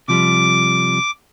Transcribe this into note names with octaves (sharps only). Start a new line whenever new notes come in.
C3 F3 G3 D6